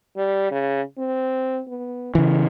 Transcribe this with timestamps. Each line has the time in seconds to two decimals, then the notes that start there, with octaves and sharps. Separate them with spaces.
0.16 G3
0.51 C#3
0.98 C4
1.68 B3
2.15 C#3 E3 G#3